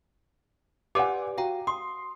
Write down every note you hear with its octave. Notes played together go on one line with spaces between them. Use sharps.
G4 B4 D5 F#5 G#5 D6
F#4 F5 G5 A#5
C6 D#6